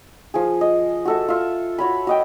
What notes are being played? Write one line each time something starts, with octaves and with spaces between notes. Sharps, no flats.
F3 G#4
D#5
F#4 A4 E5
F4 E5
F#4 C#5 B5
F#4 D#5 G5